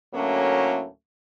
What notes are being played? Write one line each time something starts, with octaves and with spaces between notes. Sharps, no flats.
D2 A2 F#3 A3 A#3 C#4